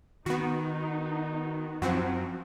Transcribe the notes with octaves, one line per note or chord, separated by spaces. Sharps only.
D#3 B3 D#4 F#4
F#2 F3 C4 F#4